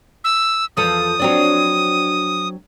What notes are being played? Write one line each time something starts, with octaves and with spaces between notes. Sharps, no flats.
E6
E2 F3 A4 D#6
F#3 C4 D4